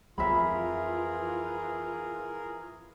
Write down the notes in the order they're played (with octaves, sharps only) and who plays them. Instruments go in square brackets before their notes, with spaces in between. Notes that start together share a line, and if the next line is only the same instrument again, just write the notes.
[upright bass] F2 [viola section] E3 F4 [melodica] G#4 A#4 [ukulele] E5 B5